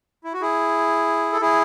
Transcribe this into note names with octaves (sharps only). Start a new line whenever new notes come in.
E4
F#4
E4 G#4
A4
E4 G#4